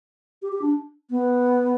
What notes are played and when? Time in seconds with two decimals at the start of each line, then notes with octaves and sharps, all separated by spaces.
0.42 G4
0.52 G4
0.62 D4
1.10 B3